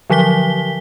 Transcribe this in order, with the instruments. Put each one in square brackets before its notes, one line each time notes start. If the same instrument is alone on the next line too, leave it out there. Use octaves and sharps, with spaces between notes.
[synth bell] D3 F3 F#3 B6 G7